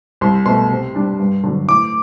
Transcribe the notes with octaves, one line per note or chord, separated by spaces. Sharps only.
C2 C6
B2 A3 C6
C3
G3 D4
G2
D3 F#3
A2 D6